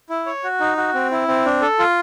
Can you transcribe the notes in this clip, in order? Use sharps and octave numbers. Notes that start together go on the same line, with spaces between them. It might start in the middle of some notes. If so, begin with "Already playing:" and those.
E4
C#5
F#4
D#4
F#4
C4
E4
C4
D4
A4
F4